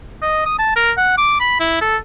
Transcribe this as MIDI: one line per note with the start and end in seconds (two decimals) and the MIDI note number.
0.22 0.42 75
0.46 0.55 87
0.59 0.72 81
0.76 0.92 70
0.98 1.15 78
1.18 1.37 86
1.40 1.59 83
1.60 1.79 64
1.81 1.97 69